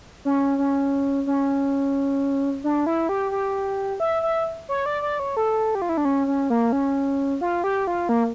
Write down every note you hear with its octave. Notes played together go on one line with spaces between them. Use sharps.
C#4
C#4
C#4
D4
E4
G4
G4
E5
E5
C#5
D5
D5
C#5
A4
G4
F4
E4
D4
C#4
C#4
A#3
C#4
F4
G4
F4
A#3